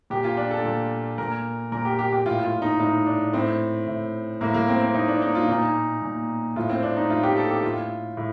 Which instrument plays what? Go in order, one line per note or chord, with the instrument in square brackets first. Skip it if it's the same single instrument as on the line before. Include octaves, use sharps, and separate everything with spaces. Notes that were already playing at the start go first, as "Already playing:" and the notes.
[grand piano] A#2 G4
F4
D4
A4
A#2
A#2 A#4
A#2 A#4
G4
G4
G4
A2 F4
F4
D#4
A2 D#4
D4
A2 C4
A2
A2 A#3
A#3
C4
C4
A2 D#4
D4
D#4
F4
A#2 D#4
A#2
A2 F4
C4
D4
D#4
A2 F4
G4
A4
G4
A2 F4
A2